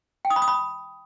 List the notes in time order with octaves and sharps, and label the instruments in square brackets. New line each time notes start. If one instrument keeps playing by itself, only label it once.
[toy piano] G5
D#6
B5
D#6
B5